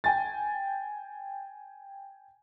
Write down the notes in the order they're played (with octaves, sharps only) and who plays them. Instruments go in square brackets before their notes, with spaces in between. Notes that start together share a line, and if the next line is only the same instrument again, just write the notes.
[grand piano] G5 G#5 A6